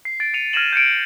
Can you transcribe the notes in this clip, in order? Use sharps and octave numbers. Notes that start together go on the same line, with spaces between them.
C7
A6 D7
C#7 D#7 F7
F6 G#6 A#6 D#7 E7 F#7
G6 G#6 C#7 D7